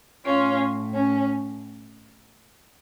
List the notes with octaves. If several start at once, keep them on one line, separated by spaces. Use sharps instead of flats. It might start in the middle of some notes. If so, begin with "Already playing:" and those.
A2 C#4 F4
C#4